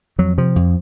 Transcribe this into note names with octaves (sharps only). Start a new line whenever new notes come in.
F2 F#3
C3 F3
F2